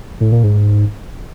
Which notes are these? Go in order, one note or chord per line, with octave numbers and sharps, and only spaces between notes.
A2
A#2
G#2